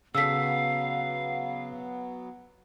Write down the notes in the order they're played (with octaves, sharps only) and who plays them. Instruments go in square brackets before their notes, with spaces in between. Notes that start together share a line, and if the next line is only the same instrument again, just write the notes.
[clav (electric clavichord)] C#3 A4 [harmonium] F#3 B3 [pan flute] F5 [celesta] E6 B6